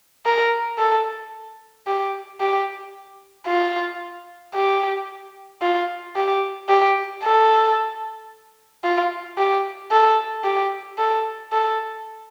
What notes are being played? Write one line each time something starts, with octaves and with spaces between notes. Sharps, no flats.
A#4
A4
G4
G4
F4
G4
F4
G4
G4
A4
F4
G4
A4
G4
A4
A4